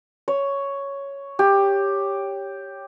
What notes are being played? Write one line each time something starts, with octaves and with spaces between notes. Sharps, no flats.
C#5
G4